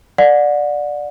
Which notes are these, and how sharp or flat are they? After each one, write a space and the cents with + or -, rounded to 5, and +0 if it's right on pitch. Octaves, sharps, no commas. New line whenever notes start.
D5 +5 F#5 -30